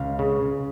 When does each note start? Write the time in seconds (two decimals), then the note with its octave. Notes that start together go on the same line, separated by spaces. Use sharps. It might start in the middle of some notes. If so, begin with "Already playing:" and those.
Already playing: C#2 F5
0.19 C#3